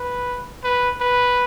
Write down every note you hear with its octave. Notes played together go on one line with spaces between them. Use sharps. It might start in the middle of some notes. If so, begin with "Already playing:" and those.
Already playing: B4
B4
B4